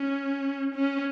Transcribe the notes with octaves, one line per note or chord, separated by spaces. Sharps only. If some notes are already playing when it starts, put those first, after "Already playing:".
Already playing: C#4
C#4